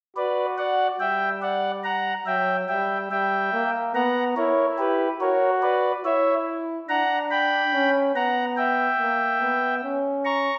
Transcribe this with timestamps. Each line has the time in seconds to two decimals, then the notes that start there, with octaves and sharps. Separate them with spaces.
0.16 F#4 B4 D5
0.58 D5 F#5
1.00 G3 E5 G5
1.42 D5 F#5
1.84 F#5 A#5
2.26 F#3 E5 G5
2.68 G3 E5 G5
3.11 G3 E5 G5
3.53 A#3
3.94 B3 F#5 A#5
4.37 E4 A#4 C#5
4.78 G4 B4
5.20 F#4 A#4 C#5
5.62 B4 D5
6.05 E4 C#5 E5
6.89 D4 F#5 A#5
7.30 G5 B5
7.73 C#4
8.15 B3 F#5 A#5
8.57 E5 G5
8.99 A#3
9.41 B3
9.84 C#4
10.25 A#5 C#6